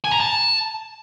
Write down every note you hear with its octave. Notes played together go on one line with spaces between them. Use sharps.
G#5
A#5
A5